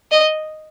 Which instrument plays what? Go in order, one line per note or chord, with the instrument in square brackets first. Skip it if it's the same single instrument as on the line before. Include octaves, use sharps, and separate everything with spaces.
[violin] D#5